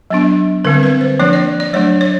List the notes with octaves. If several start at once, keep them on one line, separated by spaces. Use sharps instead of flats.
F#3 B3 D4
D3 G3 C4 A#4
B4
C5
F3 A#3 D4 C#5
D5
D5
F#3 A3 D4 C#5
C#5